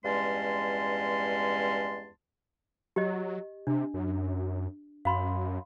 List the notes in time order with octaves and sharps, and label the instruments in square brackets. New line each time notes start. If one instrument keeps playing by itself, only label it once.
[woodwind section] E2 G2 G#3 C#4 A5 C6
[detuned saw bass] F#3 [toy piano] G4 D#5
[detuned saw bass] C3 [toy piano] D4
[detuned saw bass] F#2
[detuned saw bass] F#2 [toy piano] F5 B5 C6